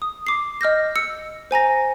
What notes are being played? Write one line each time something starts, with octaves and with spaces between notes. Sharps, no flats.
D#6
D6 C7
D#5 F6 G6 A#6
E6 C#7
C5 G#5 A#5 A#6